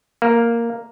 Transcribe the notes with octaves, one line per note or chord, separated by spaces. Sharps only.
A#3